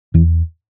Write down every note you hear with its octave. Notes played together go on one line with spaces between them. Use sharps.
E2 E3